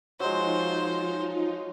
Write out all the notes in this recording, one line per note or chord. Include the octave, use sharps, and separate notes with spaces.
F3 F#3 G#3 D#4 F4 C5